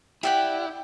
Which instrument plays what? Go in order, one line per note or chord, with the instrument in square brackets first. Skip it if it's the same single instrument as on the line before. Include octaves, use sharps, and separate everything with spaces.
[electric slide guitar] E4 [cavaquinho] G4 D5 F#5 [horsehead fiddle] G5